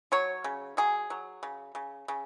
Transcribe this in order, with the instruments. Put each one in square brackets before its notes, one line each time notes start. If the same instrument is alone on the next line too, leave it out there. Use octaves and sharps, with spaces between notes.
[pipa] F#3 C#5
C#3
F#3 G#4
F#3
C#3
C#3
C#3